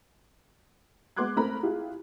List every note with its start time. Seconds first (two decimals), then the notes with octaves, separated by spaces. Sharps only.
1.16 G#3 B3 C6 D6 F#6 G#6
1.37 A3 C4 A#4 A#5 B5
1.63 E4 F4 G4 G#4